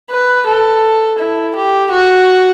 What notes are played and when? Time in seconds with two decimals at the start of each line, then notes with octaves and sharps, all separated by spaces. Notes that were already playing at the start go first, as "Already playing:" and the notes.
0.11 B4
0.47 A4
1.19 E4
1.56 G4
1.91 F#4